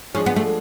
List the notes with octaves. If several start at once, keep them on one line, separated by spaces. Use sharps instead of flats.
F3 G#3 C#4 D4 G#4
B3
A3